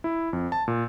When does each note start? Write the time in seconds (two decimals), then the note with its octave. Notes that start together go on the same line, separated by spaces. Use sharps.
0.04 E4
0.33 F2
0.52 A5
0.68 A#2